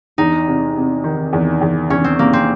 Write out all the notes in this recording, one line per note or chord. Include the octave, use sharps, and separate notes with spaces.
E2 D#4
C3
C3
D#3
E2
E2
E2 C#4
C4
C3 A#3
C4